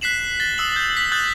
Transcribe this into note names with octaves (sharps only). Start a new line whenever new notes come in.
F#6 B6 C7 E7 F#7
A6 G7
D#6 E6 F#7
G6
B6
D#6 F#6 G6 A6 F#7